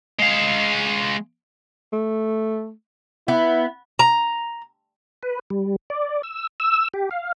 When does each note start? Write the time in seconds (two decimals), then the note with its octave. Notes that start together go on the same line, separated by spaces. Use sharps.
0.19 G#3 F5
1.93 A3
3.28 B3 E4
3.99 A#5
5.23 B4
5.50 G3
5.90 D5
6.23 E6
6.60 E6
6.94 G4
7.11 F5